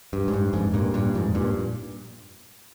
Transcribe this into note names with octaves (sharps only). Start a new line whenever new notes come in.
G2
G#2
G2
F2 G#2
G2 A#2
G2 A#2
F2 G#2
G2 A#2